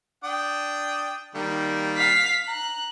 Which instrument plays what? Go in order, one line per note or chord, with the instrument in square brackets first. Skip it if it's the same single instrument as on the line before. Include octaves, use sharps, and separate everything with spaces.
[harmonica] D4 G5 D#6
D#3 G3 A#3
[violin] F5 B6
[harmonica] A#5 [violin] F#6